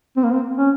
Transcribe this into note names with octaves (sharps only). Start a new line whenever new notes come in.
C4
A#3
C4
C#4